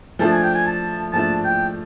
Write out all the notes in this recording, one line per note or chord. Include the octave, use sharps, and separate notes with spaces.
F3 A3 D4 A5
G#5
G5
G#5
A5
F3 A3 D4 A5
G5